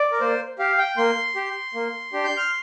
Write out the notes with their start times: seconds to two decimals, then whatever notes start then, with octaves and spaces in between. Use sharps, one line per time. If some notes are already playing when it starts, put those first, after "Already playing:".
Already playing: D5
0.12 A#4
0.20 A#3 C5
0.59 G4 F5
0.78 G5
0.97 A#3 C6
1.36 G4
1.74 A#3
2.13 D4 G4
2.24 G6
2.37 F6